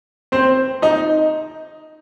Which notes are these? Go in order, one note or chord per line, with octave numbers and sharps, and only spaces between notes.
C4 C5
D#4 D#5